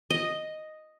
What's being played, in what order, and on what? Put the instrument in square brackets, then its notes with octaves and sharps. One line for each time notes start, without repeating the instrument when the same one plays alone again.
[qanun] D#5